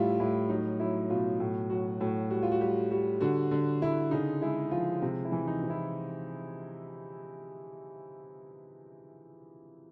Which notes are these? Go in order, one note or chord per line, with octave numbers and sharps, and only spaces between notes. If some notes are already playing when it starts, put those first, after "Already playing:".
Already playing: A2 G3 E4 F4
A2 E4
F#3 D#4
F#3 E4
B2 F4
A2 F#4
F#3 F#4
A2 F#4
G3 F#4
F4
F#4
G3 G4
G3 F#4
D3 F#4
D3
D3 E4
C#3 D#4
G#3 E4
F3 F4
C3
E4
E3
D#4
C3
E4